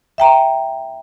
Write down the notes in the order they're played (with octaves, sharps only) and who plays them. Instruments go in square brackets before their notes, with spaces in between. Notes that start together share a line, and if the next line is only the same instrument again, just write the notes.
[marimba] E5 G5 A#5